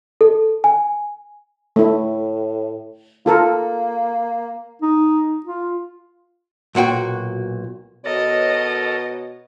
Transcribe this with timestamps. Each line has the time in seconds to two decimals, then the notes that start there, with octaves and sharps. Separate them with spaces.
0.21 A4
0.64 G#5
1.76 A2 A3 E4
3.26 A#3 F4 A4 A#4
4.82 D#4
5.46 F4
6.75 B1 A#2 F#4 G5
8.06 B2 A4 A#4 C#5 D#5